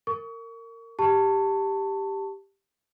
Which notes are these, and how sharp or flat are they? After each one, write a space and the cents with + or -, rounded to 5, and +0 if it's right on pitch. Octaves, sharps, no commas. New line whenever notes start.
A#4 -25 C#6 +30
G4 +0 A5 +20 C#6 +0